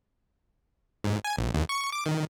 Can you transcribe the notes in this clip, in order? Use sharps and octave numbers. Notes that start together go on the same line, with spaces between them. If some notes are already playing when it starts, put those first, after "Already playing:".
G#2
G#5
A#1
D#2
C#6
D6
D#3